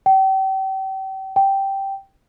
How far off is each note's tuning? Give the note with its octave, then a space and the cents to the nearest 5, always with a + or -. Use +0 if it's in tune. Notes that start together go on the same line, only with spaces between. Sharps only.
G5 -35
G5 -5